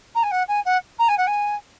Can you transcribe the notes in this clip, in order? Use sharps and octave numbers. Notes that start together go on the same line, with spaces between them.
A#5
G#5
F#5
G#5
F#5
A#5
G#5
F#5
G#5